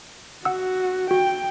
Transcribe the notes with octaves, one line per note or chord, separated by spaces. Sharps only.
F#4 F#5 E6
F#4 G5